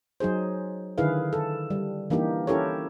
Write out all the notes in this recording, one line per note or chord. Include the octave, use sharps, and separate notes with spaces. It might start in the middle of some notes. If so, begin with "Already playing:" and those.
F#3 D#4 G#4 C5
D3 D#3 E4 G#4 B4 F5
A4
G3
E3 A#3 D4 D#4 G4
C#4 E4 G4 A4 A#4 C#5